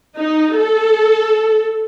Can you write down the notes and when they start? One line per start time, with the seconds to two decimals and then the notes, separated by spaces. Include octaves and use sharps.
0.16 D#4
0.56 A4